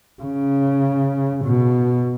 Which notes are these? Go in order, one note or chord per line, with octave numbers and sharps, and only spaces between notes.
C#3
B2